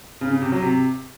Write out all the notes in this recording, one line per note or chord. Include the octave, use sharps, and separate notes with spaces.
C#3
C#3
C3
F#3
C3